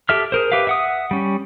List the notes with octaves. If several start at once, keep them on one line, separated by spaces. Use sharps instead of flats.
G4 A4 E5 F6
G#4 A#4 C5
G4 B4 E5 F5
E5 F#5 D#6
G3 C#4